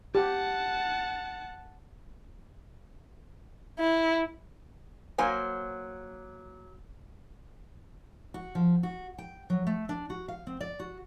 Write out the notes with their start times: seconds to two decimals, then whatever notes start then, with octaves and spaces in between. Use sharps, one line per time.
0.15 G4 F#5 A5
3.79 E4
5.18 F#3 A#3 C5 G#5
8.34 F#4
8.55 F3
8.83 F#4
9.18 G5
9.50 F#3
9.67 A3
9.89 D4
10.10 F#4
10.28 F5
10.47 C4
10.61 D5
10.80 F#4